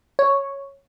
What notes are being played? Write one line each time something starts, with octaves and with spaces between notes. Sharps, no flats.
C#5